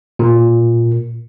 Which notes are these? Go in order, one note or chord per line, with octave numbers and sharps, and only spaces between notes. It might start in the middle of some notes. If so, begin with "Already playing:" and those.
A#2